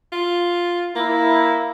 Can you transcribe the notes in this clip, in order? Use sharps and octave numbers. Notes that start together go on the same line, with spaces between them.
F4
A#3 E4